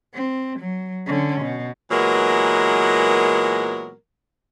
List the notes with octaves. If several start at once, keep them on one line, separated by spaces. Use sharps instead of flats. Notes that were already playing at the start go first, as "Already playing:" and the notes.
C4
F#3
D3 C#4
B2
A#2 E3 F#3 G#3 B3 A#4